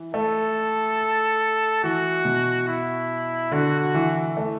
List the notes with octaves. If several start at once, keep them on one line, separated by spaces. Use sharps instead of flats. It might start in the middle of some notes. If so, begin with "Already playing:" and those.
Already playing: E3
A3 A4
E3 F#4
B2
E4
D3 F#4
F#4
E3
A3